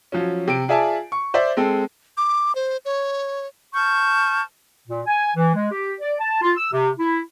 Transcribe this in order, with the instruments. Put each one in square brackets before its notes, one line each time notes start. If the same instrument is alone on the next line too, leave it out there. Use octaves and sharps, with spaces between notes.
[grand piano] F3 F#3 C#4
C3 D7
F4 G#4 D5 E5 G#5 A5
C#6
C5 D5 E5
G#3 C4 A4
[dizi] D6
C5
C#5
[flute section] A5 C#6 F6 G6
[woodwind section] A#2
G#5
E3
G#3
G4
D5
A5
F4
E6
C3
E4